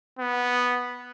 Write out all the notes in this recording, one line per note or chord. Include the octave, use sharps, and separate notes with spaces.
B3